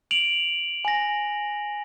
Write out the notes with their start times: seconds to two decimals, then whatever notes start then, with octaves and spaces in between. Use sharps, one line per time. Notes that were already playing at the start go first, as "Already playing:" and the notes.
0.11 D7 F7 F#7
0.85 G#5 A#6